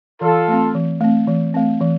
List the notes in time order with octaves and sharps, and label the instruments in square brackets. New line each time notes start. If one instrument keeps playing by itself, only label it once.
[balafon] E3 [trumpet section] F4 A4
[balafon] A3 C4
E3
A3 C4
E3
A3 C4
E3